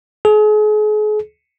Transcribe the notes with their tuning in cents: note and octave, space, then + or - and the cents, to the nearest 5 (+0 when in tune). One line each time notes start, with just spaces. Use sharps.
G#4 +40